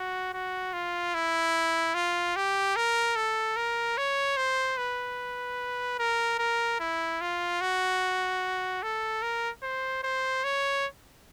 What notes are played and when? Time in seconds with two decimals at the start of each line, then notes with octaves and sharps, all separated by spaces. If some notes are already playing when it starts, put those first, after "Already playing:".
Already playing: F#4
0.34 F#4
0.73 F4
1.14 E4
1.94 F4
2.36 G4
2.76 A#4
3.16 A4
3.56 A#4
3.97 C#5
4.37 C5
4.77 B4
5.99 A#4
6.39 A#4
6.80 E4
7.21 F4
7.61 F#4
8.82 A4
9.22 A#4
9.63 C5
10.03 C5
10.44 C#5